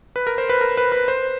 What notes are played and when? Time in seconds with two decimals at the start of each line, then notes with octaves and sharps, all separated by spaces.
0.16 B4
0.27 A#4
0.38 C5
0.49 B4
0.61 A#4
0.77 B4
0.92 B4
1.08 C5